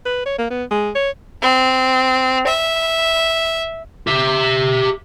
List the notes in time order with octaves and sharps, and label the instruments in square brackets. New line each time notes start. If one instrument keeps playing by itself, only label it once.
[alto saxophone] B4
C#5
A#3
B3
G#3
C#5
[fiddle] C4
E5
[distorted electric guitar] G4 E5